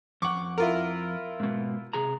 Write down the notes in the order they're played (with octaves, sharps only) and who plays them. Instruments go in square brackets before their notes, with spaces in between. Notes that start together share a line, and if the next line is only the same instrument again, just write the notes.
[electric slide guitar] F2 F#5 [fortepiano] C#6 D6
[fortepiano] E4 F4 A#4
[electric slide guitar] G#2 B2
C3 G#4 A#5